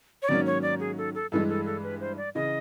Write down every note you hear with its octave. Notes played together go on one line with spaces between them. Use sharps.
C#5
G#2 D#3 F#3 A#3 C#4 D5
C#5
D5
G#4
A4
A4
G2 E3 G#3 A4
A4
A4
B4
C5
D5
C#3 E3 D#5